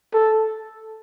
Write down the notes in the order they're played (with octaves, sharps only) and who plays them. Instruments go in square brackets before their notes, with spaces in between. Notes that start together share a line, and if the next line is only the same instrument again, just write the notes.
[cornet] A4